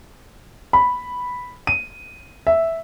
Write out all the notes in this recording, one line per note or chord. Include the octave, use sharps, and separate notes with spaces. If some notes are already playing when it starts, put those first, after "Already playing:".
B5
D#7
E5